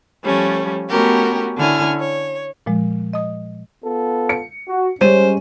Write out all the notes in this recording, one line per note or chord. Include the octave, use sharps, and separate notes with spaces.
F3 G3 A3 C#4
A3 B3 C#4 F#4 G4 A#4
D3 C#4 E4 G#5 F6
C#5
A#2 F3 G#3
D#5 D#6
B3 F4 A4
C#7
F#4
G3 G#3 C#4 C5 D#7